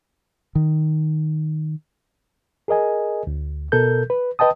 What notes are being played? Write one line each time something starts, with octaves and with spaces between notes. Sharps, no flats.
D#3
G#4 A#4 D#5 G#5
D2
B2 A4 A#4 G6
B4
B4 D#5 G5 A5 D#6